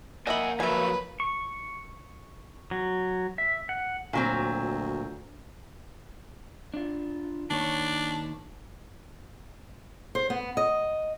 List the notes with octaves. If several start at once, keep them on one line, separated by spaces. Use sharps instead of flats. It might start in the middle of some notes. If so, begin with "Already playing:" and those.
A#3 D#5 E5 F#5 G#5 B5
F3 F#3 B4 E5 G#5
C#6
F#3
E5
F#5
D2 A#2 F#3 C4
D4 F4
D#3 A#3 D4 C#5
C5
B3
D#5